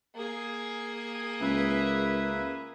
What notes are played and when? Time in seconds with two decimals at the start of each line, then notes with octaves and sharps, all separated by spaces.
0.15 A#3 G#4
1.41 C#2 B4 E5